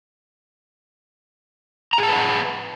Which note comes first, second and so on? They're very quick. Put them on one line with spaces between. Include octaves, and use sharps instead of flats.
A#5 G#4 A5 B4 F#5